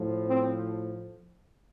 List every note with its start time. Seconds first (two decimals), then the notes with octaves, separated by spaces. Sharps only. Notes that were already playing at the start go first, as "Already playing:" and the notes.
Already playing: A2 F3
0.28 C4